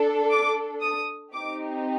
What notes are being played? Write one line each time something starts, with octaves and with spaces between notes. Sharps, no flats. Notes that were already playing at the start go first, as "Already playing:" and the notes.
Already playing: D4 A4
D6
D#6
C4 D#4 G4 D6